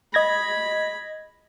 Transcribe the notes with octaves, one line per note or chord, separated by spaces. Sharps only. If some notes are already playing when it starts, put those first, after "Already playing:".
D#5 B5 G#6 A#6